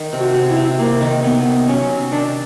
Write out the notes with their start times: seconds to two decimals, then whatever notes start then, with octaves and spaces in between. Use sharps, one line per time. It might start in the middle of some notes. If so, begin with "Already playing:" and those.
Already playing: D#3
0.13 C3
0.20 F#4
0.34 C3
0.50 E4
0.57 C3
0.78 C3 A#3
1.01 D#3
1.23 D#3 B3
1.46 D#3
1.68 F#3 C#4
1.89 C3
2.11 D#3 D4